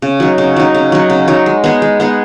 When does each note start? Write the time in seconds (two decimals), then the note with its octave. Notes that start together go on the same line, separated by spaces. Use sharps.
0.02 C#3
0.20 F#3 D#4
0.38 C#3
0.56 F#3 D#4
0.74 C#3
0.92 F#3 D#4
1.10 C#3
1.28 F#3 D#4
1.46 G#3
1.64 B3 D#4 G#4
1.82 G#3
2.00 B3 D#4 G#4